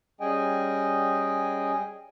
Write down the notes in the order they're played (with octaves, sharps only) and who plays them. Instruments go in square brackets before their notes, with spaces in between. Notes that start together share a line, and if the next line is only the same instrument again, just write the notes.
[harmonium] G3 C#4 G#4 D#5 G5 G#5